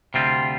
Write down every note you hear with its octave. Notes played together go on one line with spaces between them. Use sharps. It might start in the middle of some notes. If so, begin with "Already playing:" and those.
D2 C3 G3 C4 F4